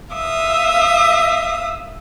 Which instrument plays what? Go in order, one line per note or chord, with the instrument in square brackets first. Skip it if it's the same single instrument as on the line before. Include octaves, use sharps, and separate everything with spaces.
[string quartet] E5 F5 D#6